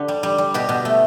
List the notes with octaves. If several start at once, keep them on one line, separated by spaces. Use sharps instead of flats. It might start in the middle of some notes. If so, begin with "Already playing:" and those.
Already playing: D3 G4
G3
G3
G3
B2 G4
B2
A3